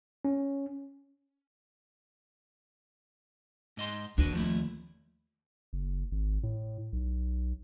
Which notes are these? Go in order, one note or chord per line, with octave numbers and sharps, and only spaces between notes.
C#4
G#2 D#5 C6
D#2 D4 F#4 B4
F3 A3 E4
F#1
G#1
A2
B1